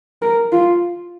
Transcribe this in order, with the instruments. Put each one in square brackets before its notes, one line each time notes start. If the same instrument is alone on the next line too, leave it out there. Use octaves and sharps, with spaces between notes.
[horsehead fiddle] A#4
F4